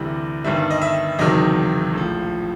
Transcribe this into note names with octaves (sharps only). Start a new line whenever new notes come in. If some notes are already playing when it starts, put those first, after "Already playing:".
Already playing: D2 C3 E3 G3
G1 G2 D#3 G3 E5
D#5
E5
F#1 E2 C3 D#3 F#3 D#5
A#1 A2 F3